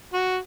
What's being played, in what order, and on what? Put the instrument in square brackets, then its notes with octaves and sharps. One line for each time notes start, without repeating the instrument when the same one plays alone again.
[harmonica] F#4